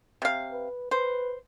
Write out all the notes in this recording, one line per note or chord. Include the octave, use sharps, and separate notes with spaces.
C3 F5
B4
B4 C5